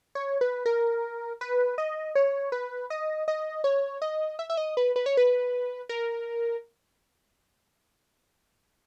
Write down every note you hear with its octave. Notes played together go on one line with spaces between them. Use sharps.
C#5
B4
A#4
B4
D#5
C#5
B4
D#5
D#5
C#5
D#5
E5
E5
D#5
B4
B4
C#5
B4
A#4